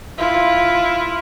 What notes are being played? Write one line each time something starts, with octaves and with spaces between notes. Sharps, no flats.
E4 F4